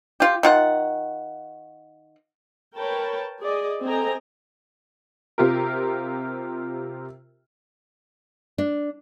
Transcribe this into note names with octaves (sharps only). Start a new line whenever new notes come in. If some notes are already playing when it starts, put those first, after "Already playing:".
F4 G4
D#3 F4 F#5
A#4 B4 C#5 G5 A5 B5
G#4 D5 D#5
C4 A4 D#5 G5 G#5 A#5
C3 F4 G4 A#4
D4